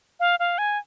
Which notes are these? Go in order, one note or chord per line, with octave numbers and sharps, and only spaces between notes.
F5
F5
G#5